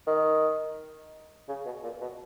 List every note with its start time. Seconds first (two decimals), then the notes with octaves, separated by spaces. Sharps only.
0.07 D#3
1.49 C#3
1.65 B2
1.83 A#2
2.01 B2